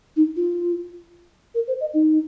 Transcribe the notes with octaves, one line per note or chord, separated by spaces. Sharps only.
D#4
F4
A#4
C5
D#5
D#4